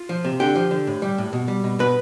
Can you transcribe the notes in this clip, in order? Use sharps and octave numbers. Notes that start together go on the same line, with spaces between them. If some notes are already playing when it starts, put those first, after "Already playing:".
Already playing: F4
F3
C3
D3 G4
F3
D3
A2
G3
A2
B2
G3
B2
B2 B4